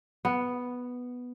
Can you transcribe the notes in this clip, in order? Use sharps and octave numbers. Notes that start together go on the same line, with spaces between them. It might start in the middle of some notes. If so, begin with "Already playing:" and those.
B3